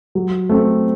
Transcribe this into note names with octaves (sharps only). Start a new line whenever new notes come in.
F#3
A3 C4